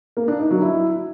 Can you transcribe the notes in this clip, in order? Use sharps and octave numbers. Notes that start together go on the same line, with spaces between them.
A#3
D4
D#4
F#3
E4